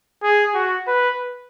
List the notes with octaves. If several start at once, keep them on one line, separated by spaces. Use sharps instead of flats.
G#4
F#4
B4